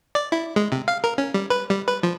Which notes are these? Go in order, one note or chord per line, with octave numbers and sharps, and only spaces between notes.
D5
E4
G#3
C3
F5
A#4
C#4
G3
B4
G3
B4
F3